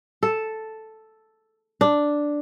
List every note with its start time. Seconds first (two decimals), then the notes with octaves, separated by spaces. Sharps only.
0.23 A4
1.81 D4